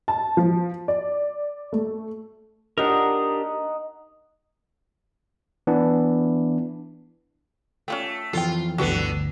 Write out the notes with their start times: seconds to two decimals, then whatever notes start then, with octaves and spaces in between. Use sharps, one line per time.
0.08 A5
0.37 F3
0.88 D5
1.73 A3
2.78 D4 D#4 G4 A#4 D#5 F#5
5.67 E3 B3 D4
7.88 A3 C#4 F4 G5
8.33 F2 E3 F4 A4 G5
8.78 G1 D2 D3 B3 F#4 G4 A4